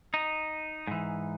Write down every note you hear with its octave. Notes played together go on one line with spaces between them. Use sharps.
D#4
G#2 E3